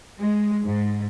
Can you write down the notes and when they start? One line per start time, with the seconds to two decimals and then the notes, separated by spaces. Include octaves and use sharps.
0.19 G#3
0.64 G#2